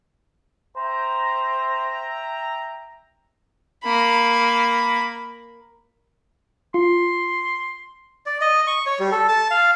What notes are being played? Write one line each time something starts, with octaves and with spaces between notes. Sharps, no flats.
C5 E5 G5 A#5
A#3 B5
F4 C6
D5
D#5
C#6
C#5
G3
A4
A5
F5